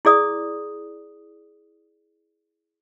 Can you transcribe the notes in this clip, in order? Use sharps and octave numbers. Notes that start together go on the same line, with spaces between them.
E4 G#4 D5 D#6